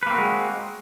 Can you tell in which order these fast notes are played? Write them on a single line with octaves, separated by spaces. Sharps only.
B4 A#3 C4 F#4 G#3